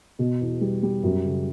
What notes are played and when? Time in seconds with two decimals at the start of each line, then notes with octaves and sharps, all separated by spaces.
0.19 B2
0.41 E2
0.61 G3
0.83 G3
1.03 F#2
1.24 C#3